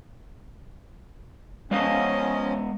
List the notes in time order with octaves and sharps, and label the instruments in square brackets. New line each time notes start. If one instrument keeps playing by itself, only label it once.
[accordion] F3 C#4 [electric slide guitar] G#3 B3 F5 [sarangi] D#5